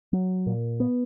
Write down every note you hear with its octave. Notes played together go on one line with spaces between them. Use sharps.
F#3
A#2
B3